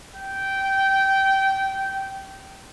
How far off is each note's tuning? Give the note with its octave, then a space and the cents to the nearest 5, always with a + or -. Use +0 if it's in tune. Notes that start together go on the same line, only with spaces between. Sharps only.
G5 -15